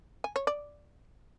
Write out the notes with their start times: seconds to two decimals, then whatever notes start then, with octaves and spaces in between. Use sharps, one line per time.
0.24 G#5
0.36 C#5
0.47 D5